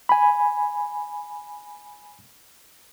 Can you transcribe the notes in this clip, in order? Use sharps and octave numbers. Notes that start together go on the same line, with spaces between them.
G#5 B5